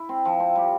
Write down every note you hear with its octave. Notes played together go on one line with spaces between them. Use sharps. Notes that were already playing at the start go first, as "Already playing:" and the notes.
Already playing: E4
C4
F3
C4
G3